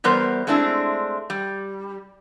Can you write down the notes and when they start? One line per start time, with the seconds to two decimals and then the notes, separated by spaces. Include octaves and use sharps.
0.04 E2 G3 B3 A#4 C5
0.47 G#3 A3 C4 D4 E4
1.30 G3